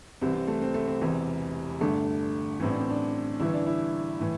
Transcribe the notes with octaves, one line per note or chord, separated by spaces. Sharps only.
C2 C3 E3 C4
C4
A3
C4
A3
C4
E1 E2 C3 E3
G1 G2 D3 A3
A1 A2 E3 C4
D4
C4
D4
G1 G2 E3 E4
D4
E4
A2 E3